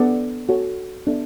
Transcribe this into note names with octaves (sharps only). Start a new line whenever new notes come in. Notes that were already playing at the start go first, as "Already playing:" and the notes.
Already playing: B3 D4 A4 D5 F#5
F#4 A4 C#5
B3 D4 A4 E5